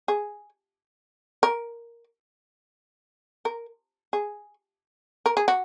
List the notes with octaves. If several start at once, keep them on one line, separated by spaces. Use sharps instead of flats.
G#4
A#4
A#4
G#4
A#4
G#4
F#4